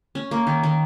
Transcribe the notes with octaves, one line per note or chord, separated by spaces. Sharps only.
C#4
A#3
D#3
D#3